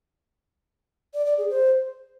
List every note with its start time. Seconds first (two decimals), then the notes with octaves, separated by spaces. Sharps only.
1.14 D5
1.26 D5
1.38 G#4
1.50 C5